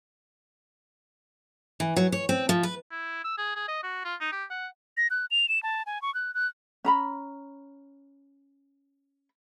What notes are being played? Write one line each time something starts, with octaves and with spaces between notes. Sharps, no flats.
E3
F#3
C#5
C4
F3
B4
E4
E6
G#4
G#4
D#5
F#4
F4
D#4
G4
F#5
A#6
F#6
F7
E7
A5
G#5
C#6
F#6
F#6
C#4 A#5 B5